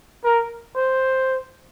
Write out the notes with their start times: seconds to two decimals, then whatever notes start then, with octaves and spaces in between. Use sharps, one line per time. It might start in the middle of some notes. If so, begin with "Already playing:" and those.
0.24 A#4
0.76 C5